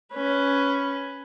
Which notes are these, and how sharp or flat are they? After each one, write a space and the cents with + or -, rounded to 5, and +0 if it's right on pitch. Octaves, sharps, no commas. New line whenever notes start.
C#4 +5 B4 +0